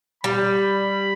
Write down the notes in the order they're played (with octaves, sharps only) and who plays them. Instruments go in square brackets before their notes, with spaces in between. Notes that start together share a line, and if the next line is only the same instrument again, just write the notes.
[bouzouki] G3 [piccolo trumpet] B5